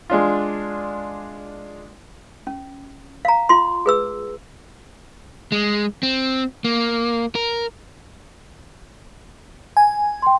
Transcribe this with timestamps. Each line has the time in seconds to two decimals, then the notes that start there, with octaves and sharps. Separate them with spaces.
0.10 G#3 D4 F4
2.47 C#4
3.25 F5 A#5
3.49 F4 C6
3.86 G#4 B4 E6
5.52 G#3
6.03 C4
6.65 A#3
7.35 A#4
9.77 G#5
10.22 G5 C6